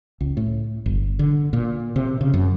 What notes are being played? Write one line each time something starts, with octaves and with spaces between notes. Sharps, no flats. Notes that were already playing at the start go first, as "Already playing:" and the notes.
C#2
A2
G1
D3
A#2
C3
C#3
F#2